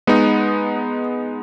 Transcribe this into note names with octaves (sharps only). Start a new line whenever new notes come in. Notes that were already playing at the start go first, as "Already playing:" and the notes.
G#3 B3 D#4